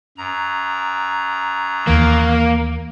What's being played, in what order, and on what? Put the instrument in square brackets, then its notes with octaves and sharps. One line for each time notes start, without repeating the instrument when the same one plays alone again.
[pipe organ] F#2 A#5
[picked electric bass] D#2 E3 [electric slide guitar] A#3